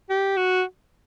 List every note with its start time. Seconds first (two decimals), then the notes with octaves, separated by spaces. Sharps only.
0.10 G4
0.37 F#4